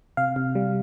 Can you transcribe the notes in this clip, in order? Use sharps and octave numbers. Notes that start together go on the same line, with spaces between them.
C3 F5
C3
G3